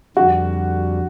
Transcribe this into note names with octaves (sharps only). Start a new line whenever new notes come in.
F2 D3 G3 F#4